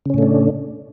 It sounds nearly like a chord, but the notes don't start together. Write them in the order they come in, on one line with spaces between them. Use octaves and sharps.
C#3 C#4 A2 A3 D4